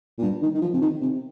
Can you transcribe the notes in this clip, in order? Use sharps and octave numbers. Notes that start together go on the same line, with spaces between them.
A#2
G2
D#3
D#3
F3
C3
D#3
C3